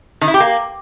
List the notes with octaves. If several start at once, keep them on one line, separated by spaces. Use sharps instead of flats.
D#3
E4
G4
A#3